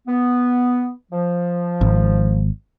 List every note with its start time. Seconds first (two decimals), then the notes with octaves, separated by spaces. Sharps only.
0.07 B3
1.12 F3
1.81 G#1